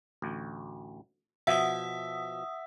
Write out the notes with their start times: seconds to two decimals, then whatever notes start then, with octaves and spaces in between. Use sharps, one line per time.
0.22 A1 D2
1.47 B2 F3 E5 F#5 D#6